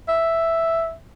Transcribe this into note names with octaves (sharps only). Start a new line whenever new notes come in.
E5